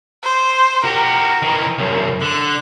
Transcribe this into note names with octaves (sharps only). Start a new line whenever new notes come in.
C5
F#4 G4 A#4
D#3 E3
C2 F#2
D3 F#6